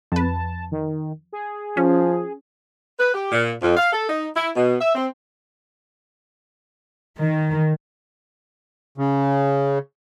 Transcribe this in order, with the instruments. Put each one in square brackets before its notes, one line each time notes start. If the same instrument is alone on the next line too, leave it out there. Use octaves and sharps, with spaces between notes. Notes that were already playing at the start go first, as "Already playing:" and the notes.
[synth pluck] F2 B4 [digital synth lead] A5
[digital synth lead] D#3
G#4
[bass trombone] F3 [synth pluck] C#4
[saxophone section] B4
G4
A#2
F2
F5
A4
D#4
E4
B2
E5
C4
[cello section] D#3
[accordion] C#3